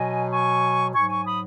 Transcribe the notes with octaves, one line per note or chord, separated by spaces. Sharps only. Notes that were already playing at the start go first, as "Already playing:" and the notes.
Already playing: B2 F#3 D#5 G#5
G#5 C#6
G#2 F#3 G#5 C#6
G#5 C#6
B5 D#6